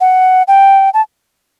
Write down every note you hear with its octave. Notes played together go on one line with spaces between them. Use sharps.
F#5
G5
A5